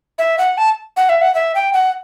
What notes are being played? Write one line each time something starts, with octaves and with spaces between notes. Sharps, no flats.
E5
F#5
A5
F#5
E5
F#5
E5
G5
F#5